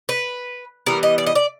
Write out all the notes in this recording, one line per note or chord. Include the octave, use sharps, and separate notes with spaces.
B4
E3 G3 B3 A#4
D#5
D5
D#5
D5